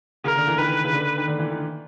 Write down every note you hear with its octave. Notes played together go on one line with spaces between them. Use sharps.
C#3 A#4
D3
E3
D#3 B4
C#3
D3
D#3
D3
E3
D#3